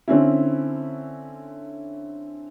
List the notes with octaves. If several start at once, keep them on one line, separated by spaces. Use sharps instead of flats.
D3 C4 C#4 E4